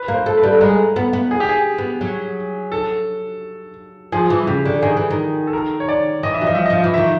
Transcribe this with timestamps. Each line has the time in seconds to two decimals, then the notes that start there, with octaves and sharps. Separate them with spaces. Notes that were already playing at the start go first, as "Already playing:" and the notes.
Already playing: B4
0.08 A#3
0.14 C5
0.26 A3
0.37 B4
0.43 G3
0.61 G#3 A#4
0.96 B3
1.13 B3
1.31 G#4
1.40 G4
1.49 G#4
1.78 B3
2.01 F#3
2.72 A4
4.12 F3 G#4
4.30 E3
4.47 C#3 G4
4.65 D3
4.82 D#3 G#4
4.97 E3
5.10 D#3
5.47 A4
5.53 A#4
5.80 C#5
5.89 D5
6.23 E3 D#5
6.34 E5
6.41 F#3
6.45 F3 D#5
6.55 E5
6.66 F3 D#5
6.84 E3
6.94 D#3 E5